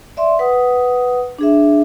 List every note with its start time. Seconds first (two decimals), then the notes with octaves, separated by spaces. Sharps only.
0.17 D5 E5 C6
0.39 B4 F#5 D#6
1.39 D4 G#4 E5